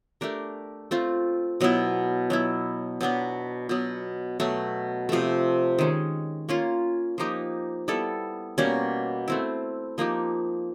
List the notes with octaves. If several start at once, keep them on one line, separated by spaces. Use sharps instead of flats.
A3 D4 G4 A#4
A3 C4 F4
B2 F#3 B3 E4
F#3 B3 E4
B2 F#3 B3 D4
B2 F#3 B3
B2 F#3 A3
C3 F3 A3
D#3 G#3 C#4
A#3 C#4 F4
F3 A#3 D#4 G4
G3 B3 E4 A4
B2 G3 A#3 C#4
A3 C4 E4
F3 A#3 D#4 G4